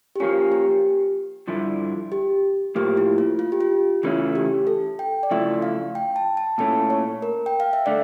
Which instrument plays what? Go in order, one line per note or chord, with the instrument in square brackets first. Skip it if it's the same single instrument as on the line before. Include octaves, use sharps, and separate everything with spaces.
[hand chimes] G4
[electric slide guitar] F3 A#3 C#4 [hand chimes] F4
[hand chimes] G4
[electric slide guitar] G2 D3 F3 E4
[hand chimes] G4
[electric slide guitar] A2 F3 A#3 [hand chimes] G4
[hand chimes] E4
F4
F4
G4
F4
[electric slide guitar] C#3 E3 A3 C#4 E4 [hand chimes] F4
[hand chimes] G4
A4
G5
D5
[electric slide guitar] C#3 F3 A3 E4 [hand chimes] E5
[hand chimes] F5
G5
A5
A5
[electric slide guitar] A#2 A3 C#4 E4 [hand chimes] A5
[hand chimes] C#5
A#4
G5
F5
E5
[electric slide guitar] D3 A3 [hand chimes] D5